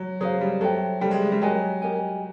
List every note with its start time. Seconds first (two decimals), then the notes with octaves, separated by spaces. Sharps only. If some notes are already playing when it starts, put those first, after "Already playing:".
Already playing: F#3
0.20 F#3 G#4 C5 F5
0.41 G3
0.61 F#3 A4 C5 E5 G5
1.00 G3 A4 C5 E5 G5
1.11 G#3
1.22 G#3
1.32 G3
1.41 F#3 G4 A#4 D#5 G#5
1.82 G4 A#4 D#5 G#5